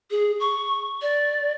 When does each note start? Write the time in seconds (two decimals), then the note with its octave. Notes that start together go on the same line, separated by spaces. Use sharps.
0.11 G#4
0.40 C#6
1.02 D5